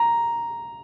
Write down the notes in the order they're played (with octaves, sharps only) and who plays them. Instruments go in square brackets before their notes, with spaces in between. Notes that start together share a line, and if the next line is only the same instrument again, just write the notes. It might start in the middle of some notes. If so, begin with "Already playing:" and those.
Already playing: [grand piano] A#5